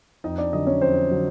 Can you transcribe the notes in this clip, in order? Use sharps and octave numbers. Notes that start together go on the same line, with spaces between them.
F2 D#4 D#5
D4 D5
D3 F#3 D#4 D#5
C#4 C#5
F2 C4 C5
D3 F#3